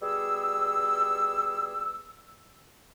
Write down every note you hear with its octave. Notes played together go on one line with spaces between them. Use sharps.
B2 G3 G#4 E6